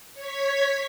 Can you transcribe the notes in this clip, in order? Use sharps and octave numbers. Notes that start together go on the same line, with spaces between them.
C#5 G#6 B6